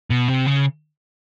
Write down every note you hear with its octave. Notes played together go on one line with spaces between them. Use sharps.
B2
C3
C#3